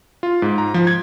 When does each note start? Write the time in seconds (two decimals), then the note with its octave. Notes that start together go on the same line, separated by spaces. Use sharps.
0.23 F4
0.42 G#2
0.58 A#5
0.74 F3
0.87 G#6